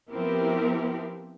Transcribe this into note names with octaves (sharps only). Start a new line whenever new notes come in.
F3 B3 C4 E4 G4 A#4